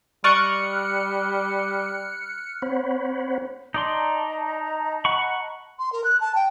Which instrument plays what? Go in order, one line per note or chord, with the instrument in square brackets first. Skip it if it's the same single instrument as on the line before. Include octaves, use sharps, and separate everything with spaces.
[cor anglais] G3 [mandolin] D5 D#5 C#6 [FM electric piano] F6 F#6 C#7
[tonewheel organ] C4 C5 C#5 F#5 B5
[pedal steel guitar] D#4 D5 C6 [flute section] D#5 A5 A#5
[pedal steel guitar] F#5 B5 C#6
[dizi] C6
A#4
F#6
A5
G5